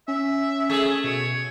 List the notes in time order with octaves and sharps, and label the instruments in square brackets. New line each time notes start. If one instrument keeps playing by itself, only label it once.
[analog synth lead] C#4 [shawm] E5
[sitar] A3 G#4
[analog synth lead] B2 [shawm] C#5